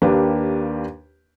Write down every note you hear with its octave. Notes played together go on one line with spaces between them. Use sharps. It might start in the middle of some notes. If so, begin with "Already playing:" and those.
D#2 A#3 D4 G4 B4